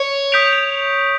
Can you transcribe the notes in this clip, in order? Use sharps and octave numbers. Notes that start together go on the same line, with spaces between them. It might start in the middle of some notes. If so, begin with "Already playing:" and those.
Already playing: C#5
D#6 G6 B6 D7 F7